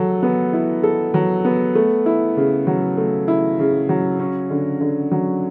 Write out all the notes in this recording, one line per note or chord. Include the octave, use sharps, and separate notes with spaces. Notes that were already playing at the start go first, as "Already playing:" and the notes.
Already playing: F#3 A4
B3
E4
A4
F#3
B3
A3
E4
C#3
F#3
A3
E4
C#3
F#3
C#4
D3
D3
F#3